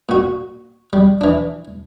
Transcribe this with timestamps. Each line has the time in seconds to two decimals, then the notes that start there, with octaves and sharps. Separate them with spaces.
0.09 A#2 F#4
0.93 G3
1.21 E3 D4